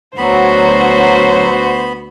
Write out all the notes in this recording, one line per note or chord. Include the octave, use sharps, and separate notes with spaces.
D2 F#3 B3 F#4 C5 B5